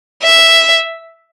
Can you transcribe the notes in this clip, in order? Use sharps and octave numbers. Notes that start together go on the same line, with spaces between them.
E5